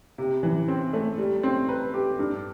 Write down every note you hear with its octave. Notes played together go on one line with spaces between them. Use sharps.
C3
E3
C4
A3
G3
C4
B4
G4
G2